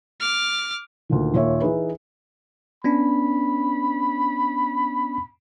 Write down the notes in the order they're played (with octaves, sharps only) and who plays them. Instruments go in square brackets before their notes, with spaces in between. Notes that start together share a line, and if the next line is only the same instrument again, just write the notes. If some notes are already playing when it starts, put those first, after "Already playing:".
[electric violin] D6 F6
[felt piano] D2 A#2 D#3
D#2 A#2 C#5 E5
E3 D#4 G#4 B4 E5
[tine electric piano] B3 C#4 D4 [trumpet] B5